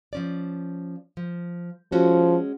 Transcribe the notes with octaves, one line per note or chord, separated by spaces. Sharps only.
F3 C#4 D5
F3
F3 G#3 C#4 F#4